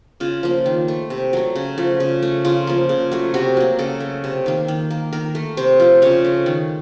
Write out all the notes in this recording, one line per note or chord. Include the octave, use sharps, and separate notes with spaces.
C#3 F4
F3 A#3
D#3
A3
C3
F#3 A3
C#3
F3 A3
C#3
A3
C#3 F4
F3 A#3
C#3
F#3 A3
C3 F#4
F#3 A#3
C#3 A4
A3
C3
D#3 A#3
D#3
A#3
D#3 A#4
A3
C3 C5
F3 A3
C#3 C#5
A3
D#3